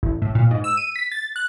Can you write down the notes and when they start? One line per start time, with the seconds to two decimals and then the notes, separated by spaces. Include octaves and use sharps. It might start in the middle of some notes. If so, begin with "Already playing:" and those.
0.03 A1
0.22 A2
0.35 A#2
0.51 G#2
0.64 E6
0.77 D#7
0.96 B6
1.12 A6
1.36 F#6